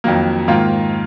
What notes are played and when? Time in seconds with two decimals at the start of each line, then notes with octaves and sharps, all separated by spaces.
0.04 F2 D#3 F#3 A#3
0.48 G#2 D#3 A#3 F4